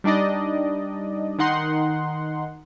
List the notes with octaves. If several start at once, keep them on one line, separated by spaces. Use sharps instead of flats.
G3 D4 D#4 D5 D#5
D#3 D#4 F#5 C6